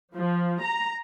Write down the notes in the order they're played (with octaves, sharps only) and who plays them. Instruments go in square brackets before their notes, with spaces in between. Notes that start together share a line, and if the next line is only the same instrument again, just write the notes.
[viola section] F3
A#5